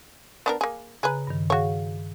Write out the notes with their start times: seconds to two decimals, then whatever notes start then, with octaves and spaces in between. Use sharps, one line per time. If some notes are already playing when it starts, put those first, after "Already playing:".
0.46 B3 D4 A#4
0.61 A#3 G#4
1.03 C#3 G#4 B4 A#5 F#6
1.27 G2 D#3
1.50 F#4 G#4 C#5 F5